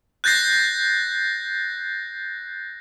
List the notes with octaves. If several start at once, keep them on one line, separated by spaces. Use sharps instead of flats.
F#6 G6 A6 A#6 C7